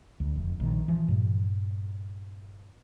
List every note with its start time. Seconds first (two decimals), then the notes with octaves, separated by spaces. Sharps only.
0.20 D2
0.36 F1
0.60 A#1 D#3
0.88 E3 F3
1.08 G2 A#2